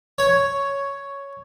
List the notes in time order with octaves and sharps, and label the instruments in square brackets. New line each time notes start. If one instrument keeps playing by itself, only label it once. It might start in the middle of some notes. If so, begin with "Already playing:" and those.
[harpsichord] C#5